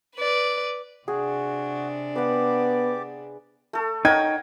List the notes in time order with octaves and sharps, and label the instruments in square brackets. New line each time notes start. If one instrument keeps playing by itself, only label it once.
[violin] B4 D5
[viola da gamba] C3 D4 [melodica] F#4 [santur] G#4
[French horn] B3 [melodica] G4 D5 D6 [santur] B4 F#5
[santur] A3 A4
[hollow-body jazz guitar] D#4 [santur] A#4 C#5 F#5 [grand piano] G5 G#6